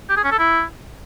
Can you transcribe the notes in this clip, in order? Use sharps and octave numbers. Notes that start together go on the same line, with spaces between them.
G4
G#4
C#4
A4
E4